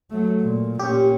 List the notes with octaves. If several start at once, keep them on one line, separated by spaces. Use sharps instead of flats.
F#3 A3
A#2
A#2 C#4 G4